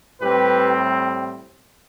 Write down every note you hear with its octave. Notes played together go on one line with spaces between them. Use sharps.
A2 G3 C4 G4 B4